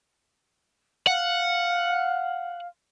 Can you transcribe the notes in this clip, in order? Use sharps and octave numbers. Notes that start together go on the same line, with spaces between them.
F5 F#5